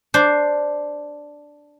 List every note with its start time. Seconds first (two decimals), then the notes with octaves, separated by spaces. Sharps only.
0.14 D4 C5